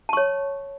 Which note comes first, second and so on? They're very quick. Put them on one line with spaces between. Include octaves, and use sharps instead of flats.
A5 C#6 C#5